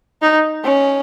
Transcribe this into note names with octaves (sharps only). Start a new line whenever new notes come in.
D#4
C#4